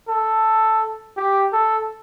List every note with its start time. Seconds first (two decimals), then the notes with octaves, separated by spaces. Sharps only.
0.08 A4
1.17 G4
1.53 A4